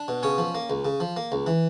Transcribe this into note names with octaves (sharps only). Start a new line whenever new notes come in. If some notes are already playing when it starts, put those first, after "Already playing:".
Already playing: D4
B2
C#3 C#4 C#5
F3
A#3
C#2
C#3
F3
A#3
C#2
E3